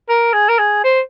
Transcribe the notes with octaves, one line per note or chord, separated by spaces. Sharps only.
A#4
G#4
A#4
G#4
C5